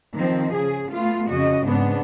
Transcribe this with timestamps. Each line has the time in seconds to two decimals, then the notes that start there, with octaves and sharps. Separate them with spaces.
0.14 D#3 F3 C4
0.55 C#3 G#4
0.91 A3 B3 F4
1.30 F2 C#3 F#4 D#5
1.64 G#2 C#3 B3 C4 D4